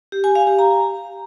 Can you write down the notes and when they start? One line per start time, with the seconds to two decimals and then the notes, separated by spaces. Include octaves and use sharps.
0.12 G4
0.24 G#5
0.35 F5
0.47 G4
0.59 A#5